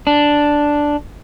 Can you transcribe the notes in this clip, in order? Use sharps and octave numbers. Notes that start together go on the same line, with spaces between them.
D4